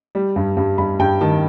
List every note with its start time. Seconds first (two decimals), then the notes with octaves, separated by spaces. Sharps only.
0.15 G3
0.36 G2
0.57 G2
0.78 G2 B5
0.99 G2 G5
1.21 D#3 A5